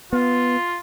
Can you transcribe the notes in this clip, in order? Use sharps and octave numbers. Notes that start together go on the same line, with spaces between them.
B3 F4